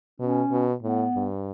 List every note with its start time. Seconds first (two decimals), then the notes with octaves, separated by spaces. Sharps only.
0.20 B2 C#4
0.51 B2
0.83 A2 B3
1.15 G2